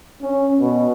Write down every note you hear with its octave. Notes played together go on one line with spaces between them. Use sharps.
C#4
B2